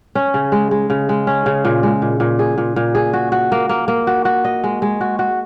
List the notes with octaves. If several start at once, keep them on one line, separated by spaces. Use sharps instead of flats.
C#4
C#3
G#3
G#3
C#3
G#3
C#4
C#3
A#2
G#3
A#2
A#2
G#4
A#2
A#2
G#4
F#4
F#4
A#3
A#3
A#3
F#4
F#4
D#5
G#3
G#3
F#4
F#4